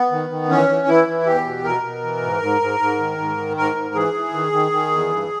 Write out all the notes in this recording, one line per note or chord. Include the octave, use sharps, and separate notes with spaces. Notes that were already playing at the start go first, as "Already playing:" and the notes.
Already playing: B3
D#3
D#3
E3 C#4
E3
E3 E4
E3
E2 G4
B2
B2 A#4
B2
E3
G#2
G#2
G#2
G#2
D#3
G#2
D#3
G#2 A#4
G#2
E3 G#4
E3
D#3
D#3
D#3
E2
G2